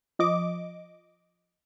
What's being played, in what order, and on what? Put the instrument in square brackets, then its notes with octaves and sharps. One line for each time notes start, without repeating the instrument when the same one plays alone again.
[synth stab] F3 D#5 D6